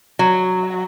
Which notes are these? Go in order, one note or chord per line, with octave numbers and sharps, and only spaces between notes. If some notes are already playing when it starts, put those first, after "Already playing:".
F#3